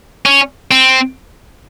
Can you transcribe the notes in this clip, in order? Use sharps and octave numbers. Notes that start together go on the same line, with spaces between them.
C#4
C4